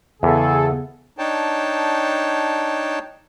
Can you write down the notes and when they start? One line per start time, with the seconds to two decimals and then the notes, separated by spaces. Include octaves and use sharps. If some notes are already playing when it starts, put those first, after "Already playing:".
0.23 E2 C#3 B3 G#4 A4
1.18 D4 D#4 C#5 G5 A5